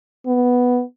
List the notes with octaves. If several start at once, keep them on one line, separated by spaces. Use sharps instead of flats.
B3